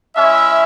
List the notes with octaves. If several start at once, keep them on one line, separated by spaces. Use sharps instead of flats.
G#3 C#4 E4 E5